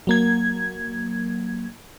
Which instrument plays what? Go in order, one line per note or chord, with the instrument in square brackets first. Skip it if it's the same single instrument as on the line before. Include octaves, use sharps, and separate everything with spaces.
[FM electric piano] F#3 A#3 G#6